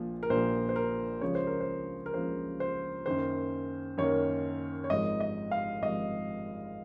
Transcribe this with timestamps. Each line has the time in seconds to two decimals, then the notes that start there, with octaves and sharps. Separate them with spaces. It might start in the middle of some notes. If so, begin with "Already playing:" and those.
Already playing: A#1 A#2 F3
0.23 A#4
0.30 A#1 A#2 F3 C5
0.69 C5
0.76 A#4
1.21 C#2 C#3 F3 A#3 C#5
1.35 C5
1.47 A#4
1.61 C5
2.06 A#4
2.14 C#2 C#3 F3 A#3 C5
2.60 C5
3.06 F#2 D#3 A#3 C5
3.98 F#2 D#3 A#3 C#5
4.84 C#5
4.90 G#1 G#2 F3 D#5
5.20 D#5
5.51 F5
5.82 G#1 G#2 F3 D#5